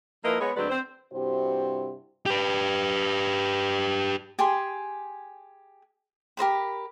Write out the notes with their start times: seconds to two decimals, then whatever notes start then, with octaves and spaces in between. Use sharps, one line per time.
0.24 F3 A#3 E4 A#4 B4 D#5
0.39 G#3 B3 C#5
0.56 D2 F#3 G#3 C4 B4 D5
0.70 C4 C5
1.13 G2 C3 E4 F#4 G4 C5
2.26 G4 B4
4.39 G4 G#4 G#5 C6
6.37 G4 A#4 C5 B5